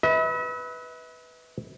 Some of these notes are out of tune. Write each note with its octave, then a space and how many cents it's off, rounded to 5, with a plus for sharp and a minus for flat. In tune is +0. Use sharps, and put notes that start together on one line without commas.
B4 +0 E5 -45